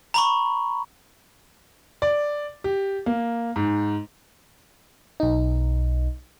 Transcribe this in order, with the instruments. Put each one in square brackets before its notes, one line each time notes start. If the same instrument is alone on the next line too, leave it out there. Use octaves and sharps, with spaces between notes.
[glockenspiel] A#5 B5 C#6
[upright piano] D5
G4
A#3
G#2
[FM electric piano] B1 D#4